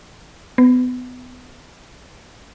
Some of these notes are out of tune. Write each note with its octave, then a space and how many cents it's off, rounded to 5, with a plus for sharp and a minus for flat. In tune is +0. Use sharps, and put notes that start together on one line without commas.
B3 +25